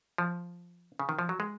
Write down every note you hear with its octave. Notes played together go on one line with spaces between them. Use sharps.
F3
C#3
D#3
F3
F#3
G#3